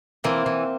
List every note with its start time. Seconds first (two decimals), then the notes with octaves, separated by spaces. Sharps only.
0.24 E3 A#3 C4
0.46 E3